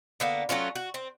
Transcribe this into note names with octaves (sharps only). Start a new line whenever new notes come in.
D3 A#3 B3
F#3 A3 C#4 F4
F#4
C4